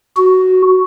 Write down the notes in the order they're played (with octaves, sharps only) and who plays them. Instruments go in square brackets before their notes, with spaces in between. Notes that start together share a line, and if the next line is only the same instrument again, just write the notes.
[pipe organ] F#4